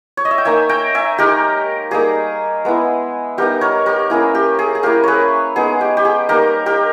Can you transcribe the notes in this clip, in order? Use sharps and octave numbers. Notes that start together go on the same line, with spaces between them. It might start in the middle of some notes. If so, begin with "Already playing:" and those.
C#5
D#5
E5
G5
A#3 D#4 E5 G#5
G5 A#5
E5 G#5
G#3 D#4 G4 A#4
G3 A#3 D#4 G#4
G#3 B3 E4
G3 B3 D#4 G4 A#4
A#4 C#5
G4 A#4
A#3 C#4 E4 G#4
G4
G#4
G#4
A#3 E4 G4 A#4
G#4 B4 C#5
G#3 B3 D#4 G#4
G4
G4
G#4
G3 A#3 D#4 G4 A#4
G4 A#4